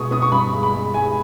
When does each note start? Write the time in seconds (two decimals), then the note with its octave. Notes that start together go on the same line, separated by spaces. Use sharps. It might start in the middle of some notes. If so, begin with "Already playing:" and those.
Already playing: B2 G#3 B3 C#6 D#6
0.11 B3 D#6
0.22 C#6
0.32 G2 B5
0.53 G#3
0.63 B5
0.73 G#3
0.94 G#3 G#5